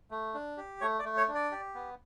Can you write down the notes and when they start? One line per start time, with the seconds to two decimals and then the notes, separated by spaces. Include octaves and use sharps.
0.11 A3
0.34 D4
0.57 G4
0.81 A3 C#5
0.99 D5
1.05 A3
1.17 C#5
1.28 D4
1.35 D5
1.52 G4
1.75 B3